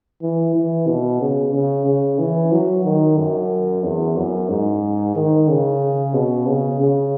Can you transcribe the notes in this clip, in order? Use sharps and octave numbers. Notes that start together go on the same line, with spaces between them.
E3
E3
B2
C#3
C#3
C#3
E3
F#3
D#3
F#2
E2
F#2
G#2
D#3
C#3
B2
C#3
C#3